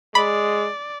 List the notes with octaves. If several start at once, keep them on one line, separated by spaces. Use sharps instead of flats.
G#3 D5 B5